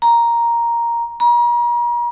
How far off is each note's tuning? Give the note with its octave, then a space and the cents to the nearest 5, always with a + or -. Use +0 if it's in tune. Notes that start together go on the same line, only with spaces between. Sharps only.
A#5 +5
A#5 +40